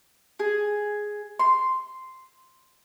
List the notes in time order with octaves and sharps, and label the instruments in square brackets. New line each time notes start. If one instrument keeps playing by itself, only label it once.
[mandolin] G#4
C6